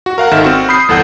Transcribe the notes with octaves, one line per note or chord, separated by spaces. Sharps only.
F#4
A#4 F5 F#5 A#5
G#1 D#3 A4 E5 F6 E7
C4 F#4
B5 D#6 G6 C7
G1 E2 A4 F#5 G6